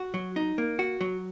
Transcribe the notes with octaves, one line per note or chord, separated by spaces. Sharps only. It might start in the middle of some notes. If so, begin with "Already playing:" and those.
Already playing: F#4
F#3
D#4
A#3
F#4
F#3